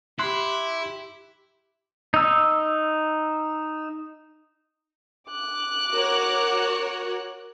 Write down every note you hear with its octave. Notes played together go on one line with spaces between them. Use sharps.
E4 G4 C6 F#6
D#4 E6
D6 F#6
F#4 A#4 C#5